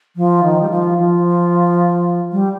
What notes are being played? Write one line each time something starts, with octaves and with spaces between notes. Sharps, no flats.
F3
D#3
G3
F3
F3
G3